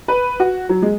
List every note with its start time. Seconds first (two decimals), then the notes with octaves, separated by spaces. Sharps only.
0.08 B4
0.40 F#4
0.69 F#3
0.82 G#3